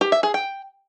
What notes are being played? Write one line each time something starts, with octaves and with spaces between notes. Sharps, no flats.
G4
E5
G#4
G5